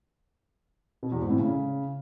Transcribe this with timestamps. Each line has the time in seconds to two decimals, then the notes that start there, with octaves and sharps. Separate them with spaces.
1.03 B2
1.12 E2
1.21 G#2
1.30 A2
1.39 C#3